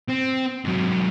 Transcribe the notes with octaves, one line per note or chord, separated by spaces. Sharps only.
C4
G#2 F#3